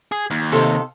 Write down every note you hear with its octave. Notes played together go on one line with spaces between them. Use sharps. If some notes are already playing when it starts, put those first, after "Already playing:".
G#4
D#2
C3 D#3 A4 C5 F5